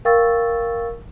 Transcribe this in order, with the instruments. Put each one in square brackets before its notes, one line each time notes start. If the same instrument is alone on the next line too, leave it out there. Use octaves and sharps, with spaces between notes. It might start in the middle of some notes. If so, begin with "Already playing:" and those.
[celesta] A#4 F5 G5 C#6 E6 A6